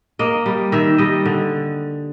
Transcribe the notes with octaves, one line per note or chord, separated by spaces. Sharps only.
A#3 D#5
G3
D#3 E5
G3 D#5
D3